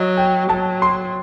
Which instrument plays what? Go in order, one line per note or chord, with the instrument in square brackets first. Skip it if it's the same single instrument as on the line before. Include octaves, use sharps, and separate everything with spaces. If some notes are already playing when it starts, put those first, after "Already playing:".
Already playing: [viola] F#3 [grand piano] D#5
[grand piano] G5
[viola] F#3 [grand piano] A5
[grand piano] C6